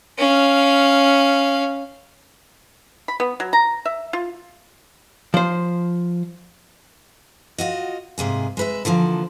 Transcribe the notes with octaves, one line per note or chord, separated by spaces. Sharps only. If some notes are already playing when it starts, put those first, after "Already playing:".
C#4 F5
B5
B3
F#3
A#5
E5
F4
F3 C5
F4 F#4 D#5
G#2 C3 A#3 G#4
G#3 B4 E5
D3 E3 F3 A#3